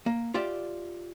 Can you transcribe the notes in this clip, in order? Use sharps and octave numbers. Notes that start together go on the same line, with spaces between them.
A#3
F4 G4 D5 E5